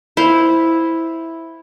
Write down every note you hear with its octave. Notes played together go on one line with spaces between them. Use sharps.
E4 C5 F5